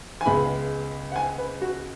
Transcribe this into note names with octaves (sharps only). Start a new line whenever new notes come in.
G#5
C#2 C#3 G#3 B3 B5
F#5
G#5
B4
F#4